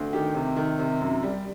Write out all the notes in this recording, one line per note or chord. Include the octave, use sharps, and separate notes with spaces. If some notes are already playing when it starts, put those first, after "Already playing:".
Already playing: D2
D#3 G4
C3
D#3
C3
F#2
G3